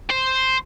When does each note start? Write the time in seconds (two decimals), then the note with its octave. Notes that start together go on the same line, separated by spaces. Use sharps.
0.10 C5